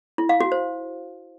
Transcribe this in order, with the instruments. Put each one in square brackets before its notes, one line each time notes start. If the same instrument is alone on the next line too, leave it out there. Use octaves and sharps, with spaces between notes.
[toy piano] E4
F5
F#4
C5